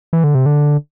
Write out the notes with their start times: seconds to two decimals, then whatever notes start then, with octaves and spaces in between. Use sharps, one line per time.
0.13 E3
0.24 D3
0.35 C3
0.46 D3